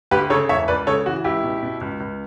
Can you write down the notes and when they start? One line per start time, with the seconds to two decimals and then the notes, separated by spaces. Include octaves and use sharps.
0.11 D2 G4 B4
0.30 C#3 A4 C#5
0.49 E1 C#5 E5
0.68 C#2 B4 D5
0.87 C#3 A4 C#5
1.06 E3 F#4
1.24 C#2 E4 G4
1.44 B2
1.63 B2
1.81 C#2
2.00 C#2